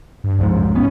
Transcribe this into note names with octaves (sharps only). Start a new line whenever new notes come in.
G2
C2 F2 G#2
F#2
A1 B3 C#4